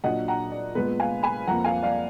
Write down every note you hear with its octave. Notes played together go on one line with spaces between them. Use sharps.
A#2 F#3 D4 D#5 F#5
F#5 A#5
D5
A#2 G#3 B3 B4
F5 G#5
G#5 B5
F2 F3 A#3 F#5 A#5
F5 G#5
D5 F5